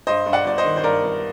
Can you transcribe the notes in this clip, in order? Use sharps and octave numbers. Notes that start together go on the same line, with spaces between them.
G2 C5 D#5
G2
D5 F#5
G1 D5
C5 D#5
D#3
C5
G2 A#4 D5
G1